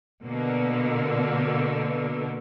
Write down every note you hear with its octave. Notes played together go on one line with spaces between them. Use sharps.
B2 D3 A#3